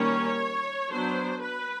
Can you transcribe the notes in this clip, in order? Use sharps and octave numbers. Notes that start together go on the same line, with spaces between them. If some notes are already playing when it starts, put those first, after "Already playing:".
Already playing: D#3 G3 A#3 C#4 C#5
F#3 B3 D4 C5
B4